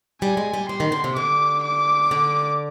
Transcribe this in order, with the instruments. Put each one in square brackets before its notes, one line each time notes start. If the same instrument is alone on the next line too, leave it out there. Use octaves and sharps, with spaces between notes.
[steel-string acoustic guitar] G3 [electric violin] G#5
[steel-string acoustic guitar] G#3
G3
[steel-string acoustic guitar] G3 [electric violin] C6
[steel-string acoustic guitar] D#3
D3
C3
[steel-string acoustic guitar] D3 [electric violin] D6
[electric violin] D6
[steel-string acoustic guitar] D3